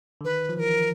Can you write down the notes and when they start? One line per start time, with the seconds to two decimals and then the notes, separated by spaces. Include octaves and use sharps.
0.21 D3
0.25 D#3 B4
0.49 F3
0.56 E3 A#4 B4